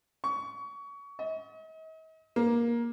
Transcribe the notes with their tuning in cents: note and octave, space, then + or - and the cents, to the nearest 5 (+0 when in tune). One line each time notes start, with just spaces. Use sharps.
C#6 +25
D#5 +45
A#3 +15